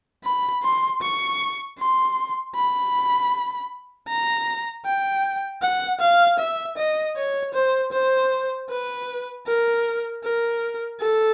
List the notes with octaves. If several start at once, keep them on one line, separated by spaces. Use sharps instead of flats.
B5
C6
C#6
C6
B5
A#5
G5
F#5
F5
E5
D#5
C#5
C5
C5
B4
A#4
A#4
A4